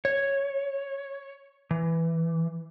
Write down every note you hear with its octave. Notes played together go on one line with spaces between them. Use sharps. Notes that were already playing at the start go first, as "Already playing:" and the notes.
C#5
E3